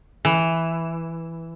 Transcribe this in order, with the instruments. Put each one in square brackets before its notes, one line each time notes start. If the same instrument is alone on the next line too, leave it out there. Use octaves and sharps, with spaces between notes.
[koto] E3